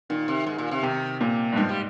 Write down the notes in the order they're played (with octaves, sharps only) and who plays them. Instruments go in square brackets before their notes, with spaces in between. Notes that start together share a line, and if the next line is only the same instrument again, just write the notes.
[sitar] A#2 [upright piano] D#3
[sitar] C3
G#2
A#2
C3
[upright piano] C3 [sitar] D#3
[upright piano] A#2
G2
[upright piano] G#2 [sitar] F3
[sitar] G3